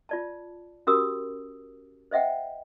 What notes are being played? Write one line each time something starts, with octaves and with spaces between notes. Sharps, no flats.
F4 D5 A5
C#4 F#4 G4 A#4 D#6 E6
C5 D#5 E5 F#5 G5